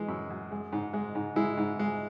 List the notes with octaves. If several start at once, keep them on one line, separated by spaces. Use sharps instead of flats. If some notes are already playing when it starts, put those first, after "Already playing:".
Already playing: E3 G#3
F#2
F#2
G#3
G#2
G#3
G#2
G#3 E4
G#2
G#3